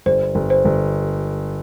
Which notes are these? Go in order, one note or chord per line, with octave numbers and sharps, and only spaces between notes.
G1 C5
G1
C5
G1